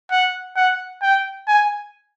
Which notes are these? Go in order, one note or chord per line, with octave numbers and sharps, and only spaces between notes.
F#5
F#5
G5
G#5